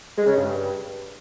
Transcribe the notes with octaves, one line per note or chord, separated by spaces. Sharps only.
G#3
C#3
G2